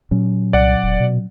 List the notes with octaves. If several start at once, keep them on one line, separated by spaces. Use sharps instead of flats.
A#2 F#3 C#4
C2 D5 F#5
E1
B2